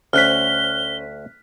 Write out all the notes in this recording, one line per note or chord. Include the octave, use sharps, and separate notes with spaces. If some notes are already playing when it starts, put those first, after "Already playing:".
D2 C#4 C5 F6 F#6 B6 G7